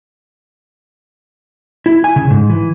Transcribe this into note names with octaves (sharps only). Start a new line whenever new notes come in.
E4
G#5
C#3
G#2
E3